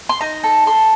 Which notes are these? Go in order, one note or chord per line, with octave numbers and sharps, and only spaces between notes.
C6
D#4 A#5
A4
A4 C6